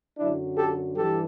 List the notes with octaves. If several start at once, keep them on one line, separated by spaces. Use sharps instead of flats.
F#2 D3 F#3 D4 E4
G4 A4
G2 E3 G4 A4